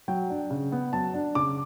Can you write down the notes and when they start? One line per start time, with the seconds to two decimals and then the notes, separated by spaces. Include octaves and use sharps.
0.08 F#3 G5
0.30 D4
0.50 C#3
0.72 B3
0.93 F#3 A5
1.14 D4
1.35 C#3 D6